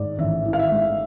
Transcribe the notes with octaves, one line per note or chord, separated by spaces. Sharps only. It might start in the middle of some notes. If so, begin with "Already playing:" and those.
Already playing: G#2 G#3 D5
A1 E5
E3
F5
E5
G#3